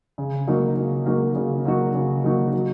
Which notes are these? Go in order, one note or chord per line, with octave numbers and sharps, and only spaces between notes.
C#3
F#3 A#3 D#4 F#4
C#3
F#3 A#3 D#4 F#4
C#3
F#3 A#3 D#4 F#4
C#3
F#3 A#3 D#4 F#4
F#3